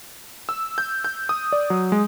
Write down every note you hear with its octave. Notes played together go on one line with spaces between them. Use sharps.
E6
G6
G6
D#6
D5
F#3
G#3